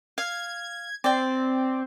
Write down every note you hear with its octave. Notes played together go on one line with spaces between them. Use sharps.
F5 G#6
C4 D5 G5